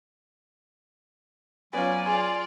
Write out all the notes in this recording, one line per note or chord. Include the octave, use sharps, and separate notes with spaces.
F#3 B3 C#4 F4 D5 G#5
F4 G#4 D5